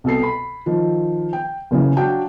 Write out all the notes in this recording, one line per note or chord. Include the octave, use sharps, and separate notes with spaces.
C2 B2 A4 C7
B5
D#3 F3
G5
F#1 C#3 E3
F#3 D4 F5 G5